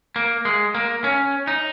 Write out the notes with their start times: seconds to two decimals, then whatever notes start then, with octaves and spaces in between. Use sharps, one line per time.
0.16 A#3
0.45 G#3
0.74 A#3
1.04 C#4
1.47 D#4